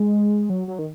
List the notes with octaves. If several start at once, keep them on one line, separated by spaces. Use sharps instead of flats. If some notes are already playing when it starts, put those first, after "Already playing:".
Already playing: G#3
F#3
F#3
D#3